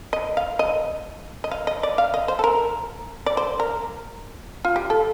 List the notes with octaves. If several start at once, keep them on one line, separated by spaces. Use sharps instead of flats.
D#5
F5
D#5
D#5
F5
D#5
D5
F5
D#5
C5
A4
A#4
D5
C5
A#4
F4
G4
A4